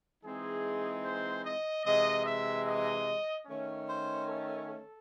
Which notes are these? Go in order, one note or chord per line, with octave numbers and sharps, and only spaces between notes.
E3 G#3 C4 D#4 G#4
C5
D#5
C3 E3 G#3 D#5
E5
D#5
D#3 A3 C#4
C5
A4
A4